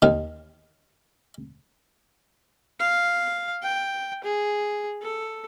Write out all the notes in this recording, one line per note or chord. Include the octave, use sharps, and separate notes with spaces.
D#2 D#3
F5
G5
G#4
A4